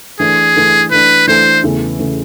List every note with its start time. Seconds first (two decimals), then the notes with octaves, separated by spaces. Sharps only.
0.20 E3 A3 D4 G#4
0.56 E3 A3 D4
0.91 E3 A3 D4 B4
1.28 E3 A3 D4 C5
1.64 E2 C#3 E3 A3
1.99 C#3 E3 A3